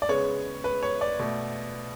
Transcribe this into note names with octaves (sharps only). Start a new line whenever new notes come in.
D5
C#3 G#3 B3 C#5
B4
C#5
D5
B2 A3